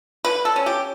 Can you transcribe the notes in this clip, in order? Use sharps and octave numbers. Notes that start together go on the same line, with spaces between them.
D3 B4
A4
C#4
G4